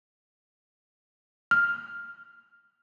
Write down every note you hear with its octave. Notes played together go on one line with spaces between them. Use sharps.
F6